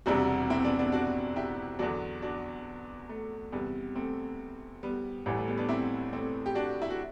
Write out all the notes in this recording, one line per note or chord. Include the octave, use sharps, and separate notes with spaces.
E1 E2 C3 G3 D4 F#4
C4 E4
B3 D4
B3 D4
D4 F#4
E4 G4
E2 D3 F#3 D4 F#4
D4 F#4
A3
E2 C3 G3 B3
A3 C4
G3 B3
A1 A2 E3 G3
A3
G3 B3
B3 D4
C4 E4
A3 C4
G4
D4 F#4
E4
F#4